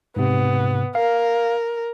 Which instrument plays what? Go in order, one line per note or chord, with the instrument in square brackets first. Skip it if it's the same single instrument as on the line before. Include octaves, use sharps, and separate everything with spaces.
[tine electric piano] G#2 C3 [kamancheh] B3
[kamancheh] A#4 [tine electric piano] F5